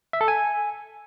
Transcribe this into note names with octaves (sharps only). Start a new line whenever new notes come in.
E5
A4
G#5